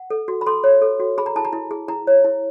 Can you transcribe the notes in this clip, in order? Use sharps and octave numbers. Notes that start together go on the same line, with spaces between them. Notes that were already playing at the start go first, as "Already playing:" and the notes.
Already playing: F#5
A4
F#4
B5
A4 C6
C#5
A4
F#4
G#4 B5
A#5
E4 A5
A#5
E4
G#4
E4 A#5
C#5
E4